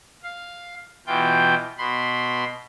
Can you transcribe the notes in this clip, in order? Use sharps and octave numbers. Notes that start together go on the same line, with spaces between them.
F5
B2 E3 F4 G5 G6
B2 B5 C6